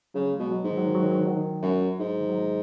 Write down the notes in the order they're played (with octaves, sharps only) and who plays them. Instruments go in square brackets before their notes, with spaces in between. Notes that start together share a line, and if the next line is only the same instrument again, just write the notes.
[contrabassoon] C#3 [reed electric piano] F#3
[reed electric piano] G#3
[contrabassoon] B2
[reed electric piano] F#3
[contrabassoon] G#2
[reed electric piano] D#3
F#3
D#3
F#3
D#3
F#3
D#3
F#3
D#3
[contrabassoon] F#2 [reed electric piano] F#3
[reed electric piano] F#3
[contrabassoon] G#2
[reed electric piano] D#3
F#3
G#3